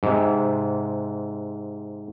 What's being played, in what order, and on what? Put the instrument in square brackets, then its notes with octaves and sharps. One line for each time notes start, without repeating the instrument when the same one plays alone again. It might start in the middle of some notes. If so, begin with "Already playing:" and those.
[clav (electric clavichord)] G#2 C3